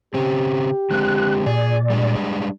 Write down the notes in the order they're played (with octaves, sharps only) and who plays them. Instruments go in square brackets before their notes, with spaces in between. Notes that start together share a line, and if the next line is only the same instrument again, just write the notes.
[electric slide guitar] C#3 C4 [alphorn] G4
[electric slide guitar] D3 G#3 C4 [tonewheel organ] F#6
[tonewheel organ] A#2 D5 [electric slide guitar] G#4
[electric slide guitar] G3 G#3 D4